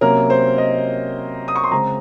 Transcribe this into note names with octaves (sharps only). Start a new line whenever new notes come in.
C3 F#3 A#3 C#4 A#4
C5
D#5
D#6
C#6
C6
C#3 G#3 C4 A#5